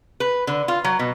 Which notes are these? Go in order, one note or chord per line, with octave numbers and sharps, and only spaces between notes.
B4
D3
F4
F#3
B2